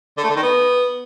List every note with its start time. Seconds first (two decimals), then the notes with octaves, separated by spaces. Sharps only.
0.18 D3
0.24 A3
0.30 D3
0.36 D#3
0.43 B3